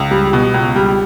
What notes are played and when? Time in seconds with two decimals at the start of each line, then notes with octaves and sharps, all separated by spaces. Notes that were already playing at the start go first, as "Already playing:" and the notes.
Already playing: C#2
0.11 G3
0.33 B2
0.54 C#2
0.76 G3